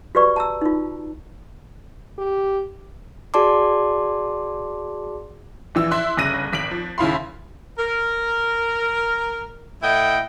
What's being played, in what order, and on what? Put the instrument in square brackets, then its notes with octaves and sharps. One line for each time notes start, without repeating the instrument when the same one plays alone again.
[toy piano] F#4 G4 B4 D5 C#6
A5 A#5 E6
D#4 F4
[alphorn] G4
[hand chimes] F#4 G#4 D5 A5 C6 D6
[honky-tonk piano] A#1 E3 E6
E4 E5 C6 F#6
G1 C#3 F#6 A#6 D#7
G#1 B6 D7 F#7
F3
D#2 C#3 E4 F5 B5 C6
[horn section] A#4
A2 E4 D#5 F#5 G5